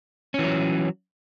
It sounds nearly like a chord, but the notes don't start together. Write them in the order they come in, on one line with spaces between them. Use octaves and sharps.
C#4 E3 F#3